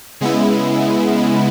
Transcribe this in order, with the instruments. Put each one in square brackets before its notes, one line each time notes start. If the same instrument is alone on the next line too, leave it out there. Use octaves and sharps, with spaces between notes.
[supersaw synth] C#3 G#3 B3 E4